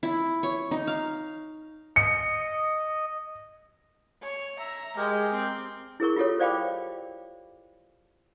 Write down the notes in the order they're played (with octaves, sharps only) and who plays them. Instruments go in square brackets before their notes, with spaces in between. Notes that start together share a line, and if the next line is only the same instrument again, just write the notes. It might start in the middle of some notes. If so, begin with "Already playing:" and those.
[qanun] E4
C#5
D#4
F5
[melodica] D#5 [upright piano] C#7
[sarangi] C#5
[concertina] E5 [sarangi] A#5
[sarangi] G#3 [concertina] G4 A#4
[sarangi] C4
[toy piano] E4 G#4 A#4 C#6
F4 G4 A4 C#5
C5 D5 F5 G5 B5 D6